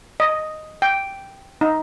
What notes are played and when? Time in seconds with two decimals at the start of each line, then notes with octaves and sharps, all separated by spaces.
0.20 D#5
0.82 G5
1.61 D#4